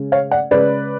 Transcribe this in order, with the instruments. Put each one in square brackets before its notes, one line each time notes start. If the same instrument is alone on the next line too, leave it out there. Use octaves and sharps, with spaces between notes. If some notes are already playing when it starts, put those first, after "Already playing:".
Already playing: [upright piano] C#3 G#3 C#4
C#5 F5
D5 F#5
C#3 G#3 C#4 B4 D5